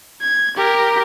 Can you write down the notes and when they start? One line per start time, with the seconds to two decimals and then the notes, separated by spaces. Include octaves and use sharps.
0.22 G#6
0.57 G4 A#4